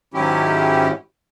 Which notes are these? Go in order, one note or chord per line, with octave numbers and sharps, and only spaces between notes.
G#2 D#3 F#3 C#4 E4 G4